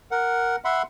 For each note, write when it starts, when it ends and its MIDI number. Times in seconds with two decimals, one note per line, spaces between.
0.11 0.56 70
0.11 0.56 78
0.65 0.82 76
0.65 0.82 78
0.65 0.82 83
0.65 0.82 84